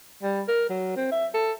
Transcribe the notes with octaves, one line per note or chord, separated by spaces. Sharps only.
G3
A#4
F#3
C4
E5
A4